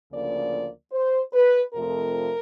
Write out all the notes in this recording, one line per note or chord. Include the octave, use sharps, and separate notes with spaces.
D2 C#3 F3 A#3 D5
C5
B4
F2 C3 F3 A3 A#4